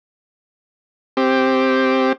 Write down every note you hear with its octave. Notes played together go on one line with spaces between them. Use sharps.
C4 G4